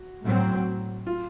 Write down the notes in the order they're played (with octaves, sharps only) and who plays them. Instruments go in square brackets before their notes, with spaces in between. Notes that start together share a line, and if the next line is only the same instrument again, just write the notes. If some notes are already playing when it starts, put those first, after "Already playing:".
Already playing: [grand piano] F#4
[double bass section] A2 F#3 C4
[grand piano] F4